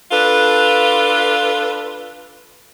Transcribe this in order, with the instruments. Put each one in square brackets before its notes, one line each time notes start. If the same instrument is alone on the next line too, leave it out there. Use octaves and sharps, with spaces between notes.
[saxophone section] D4 F4 A4 B4